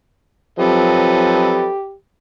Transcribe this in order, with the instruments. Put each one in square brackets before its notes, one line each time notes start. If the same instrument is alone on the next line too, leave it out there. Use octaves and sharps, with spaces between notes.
[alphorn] F3 [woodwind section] F#3 C4 [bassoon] G4 [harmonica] A4 B4 D#5